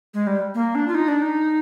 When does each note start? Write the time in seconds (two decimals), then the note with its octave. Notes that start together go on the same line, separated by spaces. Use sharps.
0.14 G#3
0.27 G3
0.55 A#3
0.75 D4
0.88 F4
0.95 D#4
1.08 D4
1.22 D#4